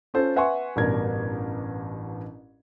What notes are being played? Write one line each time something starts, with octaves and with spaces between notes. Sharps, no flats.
C#4 F4 A4 C5
B4 E5 F#5 G#5 C6 C#6
A1 G2 B2 D4 A#4 G#6